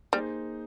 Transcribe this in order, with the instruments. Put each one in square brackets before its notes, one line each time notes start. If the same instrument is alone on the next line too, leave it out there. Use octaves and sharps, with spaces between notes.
[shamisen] G3 [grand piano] A#3 D#4 G#4 C5